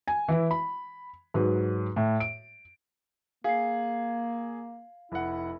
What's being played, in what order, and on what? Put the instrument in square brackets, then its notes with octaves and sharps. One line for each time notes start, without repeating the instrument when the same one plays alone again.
[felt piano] G#5
E3 E4
B5
G#2 F#3 B4
A2
D7
[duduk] A#3 [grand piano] G#4 [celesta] F5 C7
[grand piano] F1 F#5 [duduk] E4